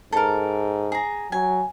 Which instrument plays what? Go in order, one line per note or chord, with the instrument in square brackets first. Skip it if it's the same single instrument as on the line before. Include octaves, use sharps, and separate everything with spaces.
[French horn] G#2 [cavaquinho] A4 A#4
[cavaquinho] G#4 A#5
[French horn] F#3 [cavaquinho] G#5